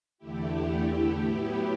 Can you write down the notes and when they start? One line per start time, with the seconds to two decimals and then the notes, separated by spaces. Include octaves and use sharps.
0.18 E2 D3 A3 E4 G4
1.18 A2 F#3 B3 E4